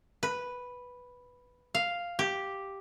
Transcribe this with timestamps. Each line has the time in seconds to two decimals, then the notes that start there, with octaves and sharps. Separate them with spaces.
0.23 B4
1.75 F5
2.19 G4